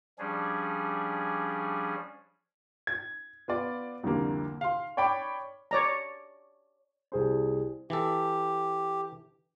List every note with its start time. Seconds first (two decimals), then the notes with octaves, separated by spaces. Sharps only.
0.19 F3 G3 C#4 D4 G#4
2.87 G#6
3.48 B3 F4 D5
4.03 C2 F2 D3 A#3
4.61 F5 C6
4.97 C#5 D5 G5 B5 D6
5.71 C#5 D5 A#5
7.12 C2 G#4 C5
7.90 E3 G4 A4